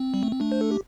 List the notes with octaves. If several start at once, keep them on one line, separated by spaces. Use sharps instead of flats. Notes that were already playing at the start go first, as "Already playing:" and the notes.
Already playing: C4
G3
A3
C4
A3 D4
C5
A4
G4